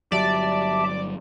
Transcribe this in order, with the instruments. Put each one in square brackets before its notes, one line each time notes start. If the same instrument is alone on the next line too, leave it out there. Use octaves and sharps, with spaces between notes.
[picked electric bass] G1 F#3 G3 [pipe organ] G4 E5 A5 [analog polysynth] D5